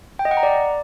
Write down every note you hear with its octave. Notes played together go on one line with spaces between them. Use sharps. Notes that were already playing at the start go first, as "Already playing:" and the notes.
G5
D#5
F#5
A#5
D5